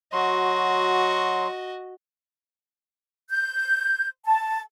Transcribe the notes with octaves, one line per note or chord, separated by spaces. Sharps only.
F#3 F#4 D#5 C6
G6
A5